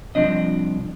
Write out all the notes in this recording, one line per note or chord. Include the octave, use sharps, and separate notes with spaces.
C2 A2 F3 C4 D4 D#5